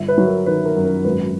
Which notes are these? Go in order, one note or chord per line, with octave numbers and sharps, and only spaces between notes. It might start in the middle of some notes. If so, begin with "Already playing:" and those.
Already playing: G1 E5
B4
F#3
A#4
D#3 B4
A#4
F#2
A#4
G#1 B4